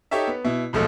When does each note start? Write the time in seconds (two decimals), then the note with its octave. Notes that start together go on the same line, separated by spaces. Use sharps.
0.11 D#4 G4 A4 C#5 E5
0.27 B3
0.45 B2 E4
0.73 D#1 B1 F3 G#3 A3 A4